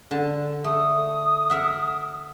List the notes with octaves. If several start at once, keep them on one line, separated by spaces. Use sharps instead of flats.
D3 A5
A3 D#6
A#4 E5 F#5